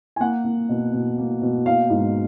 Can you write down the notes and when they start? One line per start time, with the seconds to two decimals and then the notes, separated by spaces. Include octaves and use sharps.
0.16 G#5
0.20 A#3 F#5
0.45 A#3
0.69 B2
0.93 B2
1.18 A#3
1.42 B2
1.66 A#3 F5
1.90 G#2